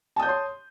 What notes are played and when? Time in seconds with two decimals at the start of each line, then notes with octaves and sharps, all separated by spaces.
0.16 A5
0.19 D#6
0.23 G6
0.26 C#5
0.29 C6